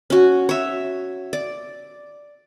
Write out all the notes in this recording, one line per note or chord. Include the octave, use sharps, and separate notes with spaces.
C#4 F#4
C#5 E5
D5